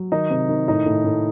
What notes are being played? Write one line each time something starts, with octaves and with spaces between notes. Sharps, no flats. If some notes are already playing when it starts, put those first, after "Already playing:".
Already playing: F#3
D#3 D#4
C3
D#3
A2 D#4
A2
A2